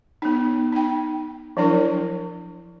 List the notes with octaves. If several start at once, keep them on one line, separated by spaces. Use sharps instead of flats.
B3 D#4
D#4 G5
F3 F#3 D4 E4 A#4